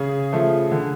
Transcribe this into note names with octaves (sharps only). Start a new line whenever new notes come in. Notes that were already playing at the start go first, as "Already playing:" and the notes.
Already playing: C#3 G#4
F3 A3
D3